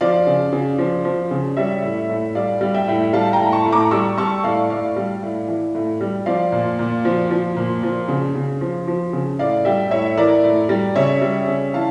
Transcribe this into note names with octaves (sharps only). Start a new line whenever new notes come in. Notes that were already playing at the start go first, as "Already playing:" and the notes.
F3 D5 F5
C#3
C#3
F3
F3
C#3
G3 C#5 E5
A2
A2
G3 D5 F5
G3
E5 G5
A2
G3 F5 A5
G5 A#5
A2
A5 C#6
A2
A#5 D6
G3 C#6 E6
G3 A5 C#6
A2 D5 F5
A2 D5 F5
G3
A2
E3
A2
G3
F3 D5 F5
A#2
A#2
F3
F3
A#2
F3
C#3
C#3
F3
F3
C#3
A2 D5 F5
G3 E5 G5
A2 C#5 E5
E3 A#4 D5
A2
G3
C#3 C#5 E5
G3
C#3
E3 F5 A5